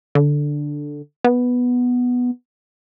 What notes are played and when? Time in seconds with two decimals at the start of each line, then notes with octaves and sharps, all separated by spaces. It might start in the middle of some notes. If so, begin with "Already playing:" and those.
0.15 D3
1.24 B3